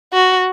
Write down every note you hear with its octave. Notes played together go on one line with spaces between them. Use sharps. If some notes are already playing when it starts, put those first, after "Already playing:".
F#4